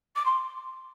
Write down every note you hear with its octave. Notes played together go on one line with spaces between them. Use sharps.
D6
C6